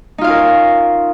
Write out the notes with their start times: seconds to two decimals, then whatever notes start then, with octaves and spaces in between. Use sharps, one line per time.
0.18 D#4
0.21 F4
0.24 F5
0.27 C#4
0.30 A#4